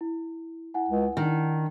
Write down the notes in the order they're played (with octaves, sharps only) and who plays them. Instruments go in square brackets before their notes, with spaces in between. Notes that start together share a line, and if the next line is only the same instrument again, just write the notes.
[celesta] E4
E4 F#5 G#5
[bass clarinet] C#2
[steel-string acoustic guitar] D#3 [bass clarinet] D4